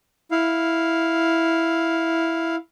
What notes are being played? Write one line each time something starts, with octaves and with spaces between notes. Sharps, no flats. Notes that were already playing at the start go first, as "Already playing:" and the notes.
E4 F5